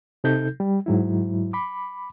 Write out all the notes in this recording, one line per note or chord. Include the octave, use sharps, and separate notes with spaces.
C3 D#4 A4 G6
G3
G#2 F#3 E4
B5 D6